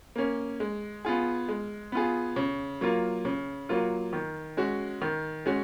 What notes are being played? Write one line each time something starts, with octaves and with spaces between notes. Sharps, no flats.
A#3 C#4
G#3
B3 F4 G#4
G#3
B3 F4 G#4
C#3
F#3 A#3 F4
C#3
F#3 A#3 F4
D#3
G#3 C#4 F#4
D#3
G#3 C#4 F#4